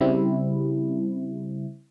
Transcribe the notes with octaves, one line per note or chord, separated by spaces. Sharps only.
C#3 G3 C4 E4